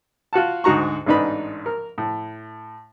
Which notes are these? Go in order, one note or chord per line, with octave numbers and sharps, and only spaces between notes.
F4 F#4 F#5 A5
D2 G#2 F#4 A#5 C#6
A1 G#2 D4 D#4 B4 B5
A#4
A2